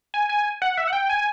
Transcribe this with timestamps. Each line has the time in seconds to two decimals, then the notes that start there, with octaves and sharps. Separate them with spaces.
0.14 G#5
0.29 G#5
0.62 F#5
0.77 E5
0.87 F#5
0.93 G5
1.09 G#5